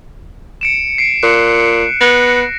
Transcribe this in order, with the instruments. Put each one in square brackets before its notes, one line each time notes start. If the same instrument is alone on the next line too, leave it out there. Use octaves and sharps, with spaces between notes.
[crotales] C#7 D7 E7
C7 D7
[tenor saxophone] A#2 [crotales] F#6 C7 C#7
[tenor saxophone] B3 [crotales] A#6